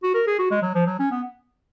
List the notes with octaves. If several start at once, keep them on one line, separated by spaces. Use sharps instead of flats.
F#4
A#4
G#4
F#4
G#3
F#3
F3
F#3
C#4
B3